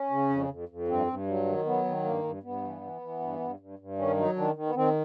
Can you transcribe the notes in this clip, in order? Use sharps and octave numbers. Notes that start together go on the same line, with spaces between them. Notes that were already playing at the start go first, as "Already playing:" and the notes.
Already playing: C#4
C#3
F2
F2
F2
G2 C4
G2
F#3
D#3
F#3 B3
D#3
G2 A#3
G2
G2 B3
E3
E3
E3
G2
G2
G2
G2
D#3 C#4
F#3 D#4
D#3 D4
D#3
B3
D#3 C4